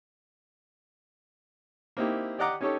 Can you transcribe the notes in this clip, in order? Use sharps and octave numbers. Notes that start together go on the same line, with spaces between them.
A#3 C4 D#4 E4 G4
G4 D5 D#5 F#5 A#5 D6
C#4 D#4 G4 A4 C#5